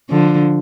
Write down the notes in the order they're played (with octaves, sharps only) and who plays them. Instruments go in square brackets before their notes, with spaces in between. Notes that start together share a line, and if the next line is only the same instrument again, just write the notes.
[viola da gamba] D3 F3